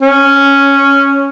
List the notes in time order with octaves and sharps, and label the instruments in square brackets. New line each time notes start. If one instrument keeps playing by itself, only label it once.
[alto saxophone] C#4